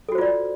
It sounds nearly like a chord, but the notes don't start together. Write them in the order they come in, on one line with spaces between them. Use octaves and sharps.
A4 F#4 C5 F4 D5